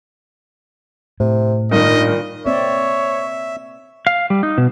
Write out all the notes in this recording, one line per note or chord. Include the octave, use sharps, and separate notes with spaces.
A2 C3
G2 A#2 D#3 D#5
A#3 C4 C#5 D5 E5
F5
G3
D#4
B2